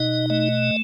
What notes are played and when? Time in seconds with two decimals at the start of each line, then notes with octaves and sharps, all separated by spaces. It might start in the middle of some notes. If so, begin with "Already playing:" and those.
Already playing: B2 D#4 D#5
0.30 A3 D#5